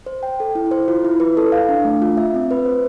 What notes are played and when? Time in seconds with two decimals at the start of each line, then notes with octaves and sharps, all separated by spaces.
0.06 C5
0.23 G5
0.40 A4
0.55 E4
0.71 C5
0.88 F4
1.05 E4
1.20 B4
1.37 A4
1.52 F5
1.69 D4
1.85 A3
2.02 F4
2.17 E5
2.34 C4
2.51 B4
2.66 C5